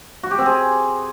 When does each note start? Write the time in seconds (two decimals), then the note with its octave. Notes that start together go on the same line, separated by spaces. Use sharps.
0.23 F#4
0.31 G4
0.38 C4
0.46 G#4